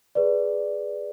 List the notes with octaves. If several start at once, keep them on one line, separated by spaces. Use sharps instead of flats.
G#4 B4 D5